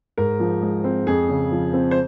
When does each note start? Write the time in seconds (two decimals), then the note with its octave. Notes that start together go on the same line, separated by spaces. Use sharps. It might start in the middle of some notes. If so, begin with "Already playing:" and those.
0.18 G#2 A#4
0.40 F3
0.62 G#3
0.84 C4
1.07 F2 G#4
1.29 C#3
1.51 F3
1.73 C4
1.91 C5